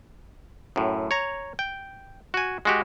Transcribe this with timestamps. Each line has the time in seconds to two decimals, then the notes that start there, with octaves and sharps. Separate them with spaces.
0.76 F#2 A2
1.11 C#5 A#5
1.59 G5
2.34 F#4 G#5
2.65 G#3 F#4 G4